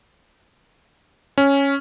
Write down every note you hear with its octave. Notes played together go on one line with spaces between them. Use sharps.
C#4